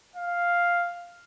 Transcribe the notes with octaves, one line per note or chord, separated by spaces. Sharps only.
F5